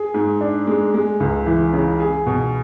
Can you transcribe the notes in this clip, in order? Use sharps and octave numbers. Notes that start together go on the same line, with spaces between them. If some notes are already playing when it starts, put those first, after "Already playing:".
Already playing: G#4
G#2
D4
G#3
G#3
C#2
E3
C#3
G#4
B2